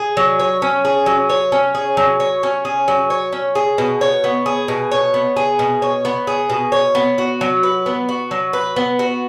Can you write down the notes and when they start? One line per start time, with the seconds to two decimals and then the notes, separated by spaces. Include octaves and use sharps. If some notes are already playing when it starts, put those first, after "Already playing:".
Already playing: G#4
0.17 F#3
0.39 C#5
0.62 C#4
0.85 G#4
1.06 F#3
1.30 C#5
1.52 C#4
1.75 G#4
1.97 F#3
2.20 C#5
2.43 C#4
2.65 G#4
2.88 F#3
3.10 C#5
3.33 C#4
3.55 G#4
3.78 B2
4.01 C#5
4.24 B3
4.46 G#4
4.68 B2
4.91 C#5
5.14 B3
5.36 G#4
5.59 B2
5.82 C#5
6.05 B3
6.27 G#4
6.50 B2
6.72 C#5
6.95 B3
7.18 F#4
7.41 F#3
7.63 B4
7.86 B3
8.09 F#4
8.31 F#3
8.53 B4
8.76 B3
8.99 F#4